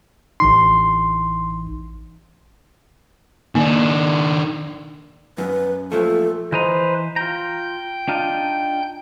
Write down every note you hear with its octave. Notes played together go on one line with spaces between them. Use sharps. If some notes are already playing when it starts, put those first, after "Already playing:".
A1 E3 D#4 C6
D#3 A#3 D4
F#2 B4
A#2 F3 A3 A4
E3 B4 C5 D#5 A#5
F4 G5 A#5 G6
D4 D#4 F4